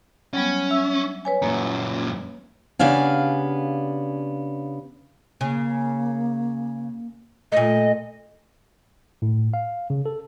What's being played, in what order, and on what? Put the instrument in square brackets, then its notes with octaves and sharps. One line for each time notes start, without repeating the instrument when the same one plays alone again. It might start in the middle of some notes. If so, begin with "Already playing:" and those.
[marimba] F#3 G3 B3 [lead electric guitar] C#4
[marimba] E5 E6
B4 C#5 G#5
[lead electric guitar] F#2 A#2 [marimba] A#3
[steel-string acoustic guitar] C#3 B3 D4 G4 F5 G#5
[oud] C#3 [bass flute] A#3
[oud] A#2 A3 [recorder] D#5
[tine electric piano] A2
F5
C#3
A4